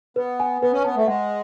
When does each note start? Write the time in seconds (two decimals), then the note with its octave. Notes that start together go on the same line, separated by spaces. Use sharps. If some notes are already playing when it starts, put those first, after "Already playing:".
0.16 B3 B4
0.40 G#5
0.62 B3 B4
0.73 C#4
0.85 B3 A5
0.97 A3
1.07 G#3 F#5